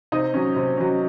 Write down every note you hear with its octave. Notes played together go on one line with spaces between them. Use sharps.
C3 D#4 D#5
F#3 C#4
C3
F#3 C#4